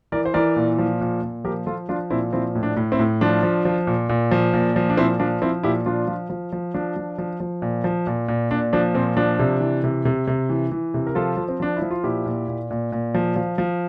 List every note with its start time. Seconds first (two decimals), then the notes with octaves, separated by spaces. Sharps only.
0.12 E3 A#4 D5
0.25 C5
0.34 E3 A#4 D5
0.56 A#2
0.78 F3
1.01 A#2
1.22 A#2
1.44 F3 G4 A#4
1.66 F3 F4 A4
1.89 F3 D4 F4
2.10 A#2 C4 E4
2.33 F3 C4 E4
2.55 A2
2.63 D4
2.76 A2
2.92 C4 E4
2.99 A2
3.21 F3 D4 F4
3.43 F3
3.65 F3
3.87 A#2
4.09 A#2
4.31 F3
4.54 A#2
4.76 F3
4.90 D4
4.97 A#2 C4 E4
5.20 F3 D4
5.42 F3 C4 E4
5.63 A#2 E4 G4
5.86 F3 D4 F4
6.07 F3
6.30 F3
6.52 F3
6.74 F3 D4
6.96 F3
7.18 F3
7.40 F3
7.62 A#2
7.84 F3
8.07 A#2
8.28 A#2
8.51 A#2 D4
8.73 F3 D4
8.94 A#2 C4
9.17 F3 D4
9.39 C3
9.61 E3
9.84 C3
10.05 C3
10.27 C3
10.49 E3
10.71 E3
10.94 C3
11.07 A#4
11.15 F3 F4 A4
11.37 F3
11.49 C4
11.60 F3 D4
11.77 E4
11.82 F3
11.91 F4
12.04 A#2 E4 G4
12.26 A#2
12.48 A#2
12.70 A#2
12.92 A#2
13.14 F3
13.36 F3
13.58 F3